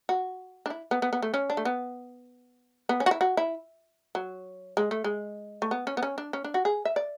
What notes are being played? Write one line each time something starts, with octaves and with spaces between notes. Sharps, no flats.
F#4
D4
E4
B3
B3
B3
A3
C#4
D4
A3
B3
B3
C#4
F#4
E4
F#4
E4
F#3
G#3
A3
G#3
A3
B3
C#4
B3
C#4
D4
C#4
D4
F#4
G#4
E5
D5